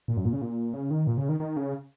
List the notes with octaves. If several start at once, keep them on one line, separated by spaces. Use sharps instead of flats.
A#2
F#2
A#2
C#3
A#2
C#3
D#3
A#2
C#3
D#3
D#3
C#3